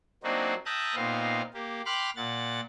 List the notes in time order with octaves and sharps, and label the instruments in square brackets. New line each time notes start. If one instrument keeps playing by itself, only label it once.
[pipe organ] F#3 A#3 C4 D4 D#4 F#4
E5 G5 A5 A#5 D#6 F#6
A#2 B3 C4 D#4 F5
A#3 G4
G5 B5 C6 D6 F6 F#6
A#2 F#5 A6